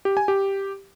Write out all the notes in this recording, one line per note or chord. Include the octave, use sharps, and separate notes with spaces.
G4
G#5
G4